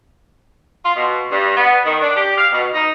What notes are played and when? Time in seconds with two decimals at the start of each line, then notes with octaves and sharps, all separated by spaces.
0.84 F4
0.96 B2
1.30 G2
1.56 B3
1.86 D#3
2.01 D4
2.16 G4
2.38 F5
2.52 B2
2.73 D#4